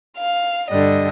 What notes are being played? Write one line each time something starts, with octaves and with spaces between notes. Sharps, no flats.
F5
G2 D3 G3 D#5